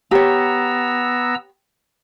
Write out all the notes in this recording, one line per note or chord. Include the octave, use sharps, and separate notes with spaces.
B3 G4 C#5 A#5 E6